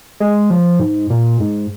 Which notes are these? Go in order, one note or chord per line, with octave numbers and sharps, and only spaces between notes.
G#3
F3
G#2
A#2
G#2